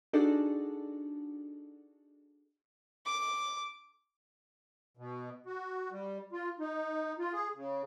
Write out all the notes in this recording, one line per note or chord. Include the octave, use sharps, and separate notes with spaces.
D4 D#4 F#4 G#4 A4 D5
D6
B2
F#4
G3
F4
D#4
F4
G#4
C#3